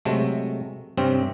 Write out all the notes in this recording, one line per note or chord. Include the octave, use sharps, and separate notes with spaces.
C3 F#3 G#3 A3
G2 C3 C4 C#4